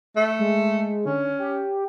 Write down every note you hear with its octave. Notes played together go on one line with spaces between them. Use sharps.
A3
G#3
D3 C#4
G4